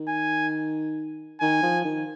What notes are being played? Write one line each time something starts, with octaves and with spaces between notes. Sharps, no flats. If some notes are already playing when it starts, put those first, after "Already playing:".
Already playing: D#3
G#5
D#3 G#5
F3
D#3